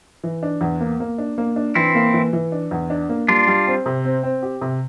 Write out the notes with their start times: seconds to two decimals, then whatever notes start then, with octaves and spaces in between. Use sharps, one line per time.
0.24 E3
0.43 D4
0.61 E2
0.81 A#3
1.00 A#3
1.18 D4
1.38 A#3
1.56 D4
1.75 E3 C4 E4
1.95 A#3
2.14 E3
2.33 E3
2.52 D4
2.71 E2
2.90 D4
3.09 A#3
3.28 G3 D4 F4
3.47 G3
3.67 C4
3.86 C3
4.05 C4
4.23 C4
4.43 G4
4.61 C3